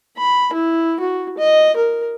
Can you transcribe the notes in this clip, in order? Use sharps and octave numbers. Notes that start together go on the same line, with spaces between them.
B5
E4
F#4
D#5
A#4